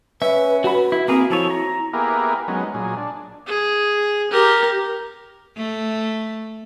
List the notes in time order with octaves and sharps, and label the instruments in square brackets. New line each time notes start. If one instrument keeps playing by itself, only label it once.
[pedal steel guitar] C#4 [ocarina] B4 [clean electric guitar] E5
[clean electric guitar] F#4 B5 [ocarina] B4
[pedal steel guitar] E4
[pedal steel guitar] A#3 G#4 A#4 [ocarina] C4
[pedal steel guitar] F3 A4 C#5 [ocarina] E4
[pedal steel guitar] A#5
[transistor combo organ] A#3 B3 E4 G4 G#4 A#4
F#3 G#3 B3 C#4 D#4
A#2 F#3 G#4
D4
[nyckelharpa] G#4
G4 A#4
[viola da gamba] A3